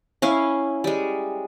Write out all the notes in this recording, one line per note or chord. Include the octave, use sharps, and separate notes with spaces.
C#4 E4 F5
G3 G#3